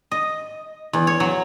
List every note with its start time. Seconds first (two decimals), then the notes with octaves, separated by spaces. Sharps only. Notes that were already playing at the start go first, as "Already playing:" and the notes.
0.12 D#5
0.93 E2
1.07 C#5
1.20 F#3